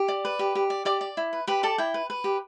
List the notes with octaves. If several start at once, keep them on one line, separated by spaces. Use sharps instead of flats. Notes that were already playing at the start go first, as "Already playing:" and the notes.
Already playing: G4
D5
B4
G4
G4
D5
G4 D5 D6
D5
E4
B4
G4 B4 B5
A4 D5 A5
E4 G5
B4
B4
G4